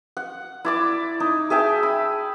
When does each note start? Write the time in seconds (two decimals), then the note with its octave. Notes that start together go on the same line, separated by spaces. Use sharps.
0.17 F#5
0.65 E4 D5 D6
1.20 D#4
1.50 G#4 E5 G5 A5
1.83 B5